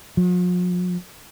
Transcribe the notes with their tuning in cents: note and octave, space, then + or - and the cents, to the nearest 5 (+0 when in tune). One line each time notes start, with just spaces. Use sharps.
F3 +45